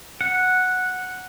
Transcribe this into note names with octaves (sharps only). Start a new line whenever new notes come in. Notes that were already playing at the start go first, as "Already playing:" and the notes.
F#5